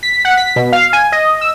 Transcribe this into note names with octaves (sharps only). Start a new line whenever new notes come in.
B6
F#5
B6
B2
F5
G#5
D#5
E6